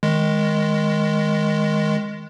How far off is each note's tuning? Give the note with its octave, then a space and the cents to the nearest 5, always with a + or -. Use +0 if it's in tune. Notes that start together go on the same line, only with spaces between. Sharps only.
D#3 +10 G#3 +0